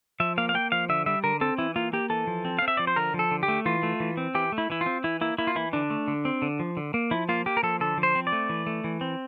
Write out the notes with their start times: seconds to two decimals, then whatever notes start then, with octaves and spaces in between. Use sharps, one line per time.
0.20 F3 E5
0.38 A#3 F5
0.49 F5
0.55 A#3 G5
0.72 F3 F5
0.89 D3 E5
1.06 G3 E5
1.24 D3 A#4
1.41 C4 A4
1.58 E3 E4
1.76 A#3 F4
1.93 A#3 G4
2.10 E3 A4
2.27 F3
2.45 C4
2.59 C4 F5
2.68 E5
2.77 F3 D5
2.87 C5
2.96 D3 A#4
3.14 F3
3.19 A4
3.31 D3
3.43 G4
3.48 A3
3.66 E3 F4
3.83 A3
4.00 E3
4.17 C4
4.35 E3 G4
4.52 A3
4.58 E4
4.70 E3 E4
4.81 F4
4.86 C4
5.04 E3 E4
5.21 A#3 E4
5.38 A#3 E4
5.47 F4
5.56 E3 E4
5.73 D3 D4
5.90 A3
6.08 D3
6.25 C4
6.42 D3
6.59 F3
6.77 D3
6.94 A#3
7.11 F3 E4
7.29 A#3 F4
7.46 A#3 G4
7.57 A#4
7.63 F3 A4
7.80 D3 A4
7.98 F3
8.03 C5
8.15 C4
8.27 D5
8.32 A3
8.49 E3
8.67 A3
8.84 E3
9.01 C4